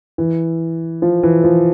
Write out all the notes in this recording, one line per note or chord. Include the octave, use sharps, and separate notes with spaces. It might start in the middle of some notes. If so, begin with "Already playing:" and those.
E3
F3
E3
F3